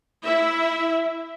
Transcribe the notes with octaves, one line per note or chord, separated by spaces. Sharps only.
E4 E5